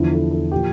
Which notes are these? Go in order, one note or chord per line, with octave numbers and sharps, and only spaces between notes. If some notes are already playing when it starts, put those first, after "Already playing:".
Already playing: E2 D3 F3 E4
A4
A4
A#2 F3 G4